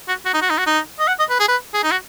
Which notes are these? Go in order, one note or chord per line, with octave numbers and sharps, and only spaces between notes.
F#4
F#4
D#4
F#4
D#4
F#4
D#4
D#5
F#5
D#5
B4
G#4
B4
G#4
D#4
F#4